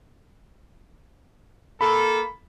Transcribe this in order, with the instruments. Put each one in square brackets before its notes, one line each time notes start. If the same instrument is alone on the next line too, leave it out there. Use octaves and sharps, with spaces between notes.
[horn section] A#3 A4 [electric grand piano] B5